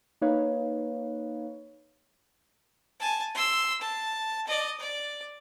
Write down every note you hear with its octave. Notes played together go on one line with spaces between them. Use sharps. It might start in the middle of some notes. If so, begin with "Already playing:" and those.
A#3 D#4 B4 C#5 F5
G#5 A5
C6 E6
A5
D5 D#5
D5